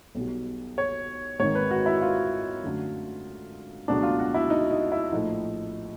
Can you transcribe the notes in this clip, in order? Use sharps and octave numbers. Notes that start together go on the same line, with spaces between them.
B1 B2 G3
C#5
G#1 G#2 D#3 C#5
B4
F#4
E4
F4
F#2 D3 F#3 A3
C#2 B2 F#3 A3 D4
F4
F#4
E4
D#4
D#4
E4
A#1 A2 F3 D#4